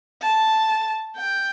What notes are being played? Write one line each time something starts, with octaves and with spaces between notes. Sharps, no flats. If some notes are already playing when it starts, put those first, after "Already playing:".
A5
G5